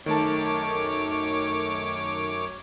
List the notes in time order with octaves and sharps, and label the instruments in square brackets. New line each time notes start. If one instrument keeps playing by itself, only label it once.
[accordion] F#2 C#5 D6 [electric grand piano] D#3 A3 A5